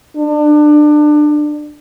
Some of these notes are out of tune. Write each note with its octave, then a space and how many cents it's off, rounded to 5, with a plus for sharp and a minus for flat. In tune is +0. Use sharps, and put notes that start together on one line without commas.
D4 +25